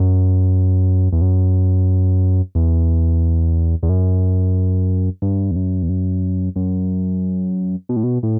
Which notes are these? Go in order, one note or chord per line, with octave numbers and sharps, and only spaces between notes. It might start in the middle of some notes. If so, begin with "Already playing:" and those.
Already playing: F#2
E2
F#2
E2
E2
F#2
G2
E2
F#2
E2
F#2
F#2
B2
A2
B2
A2